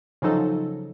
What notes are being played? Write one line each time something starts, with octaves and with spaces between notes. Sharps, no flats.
C#3 F3 F#3 D#4 A4